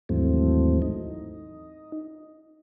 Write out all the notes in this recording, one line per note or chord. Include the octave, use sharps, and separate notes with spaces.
D#2 G#2 E3 F#3 A3 C4
D#4